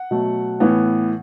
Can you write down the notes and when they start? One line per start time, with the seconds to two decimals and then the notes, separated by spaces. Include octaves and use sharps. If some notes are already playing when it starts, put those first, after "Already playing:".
Already playing: F#5
0.11 B2 F#3 A3
0.60 A2 E3 B3